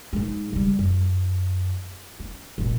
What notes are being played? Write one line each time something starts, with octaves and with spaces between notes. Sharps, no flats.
G#2 G#3
C#3 G3
F#2
C#4
A#1 C3